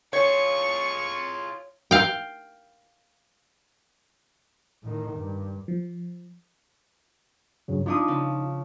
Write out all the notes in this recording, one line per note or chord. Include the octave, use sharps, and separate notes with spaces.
F4 G#4 C#5 C#6
F5 G5
A2 D#3
G2
F3
G2 C#3 F#3
F3 D4 D#4 F4 D#6
C#3